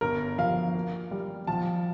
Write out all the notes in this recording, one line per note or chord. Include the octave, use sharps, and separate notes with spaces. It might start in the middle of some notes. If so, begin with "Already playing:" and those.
G1 A#4
F3 F5
A#3
G3
F3 A5